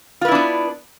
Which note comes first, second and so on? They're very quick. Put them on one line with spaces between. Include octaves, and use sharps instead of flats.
F4 B4 E4 D4 B3